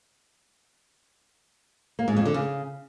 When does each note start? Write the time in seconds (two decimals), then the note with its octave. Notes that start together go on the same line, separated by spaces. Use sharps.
1.99 A#3
2.08 G#2
2.17 F2
2.25 D3
2.34 C#3